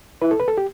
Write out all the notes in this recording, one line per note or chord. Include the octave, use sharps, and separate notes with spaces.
E4 B4
A4
B4
A4
G4